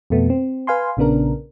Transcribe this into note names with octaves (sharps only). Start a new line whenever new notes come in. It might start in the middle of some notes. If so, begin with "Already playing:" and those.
F2 B2 A3 B3
C4
B4 F5 G#5 C6
A#1 C#3 B3 D4 A#4